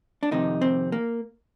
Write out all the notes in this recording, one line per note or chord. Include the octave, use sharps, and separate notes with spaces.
D4
F2 C3 D#3 D#4
C4
A#3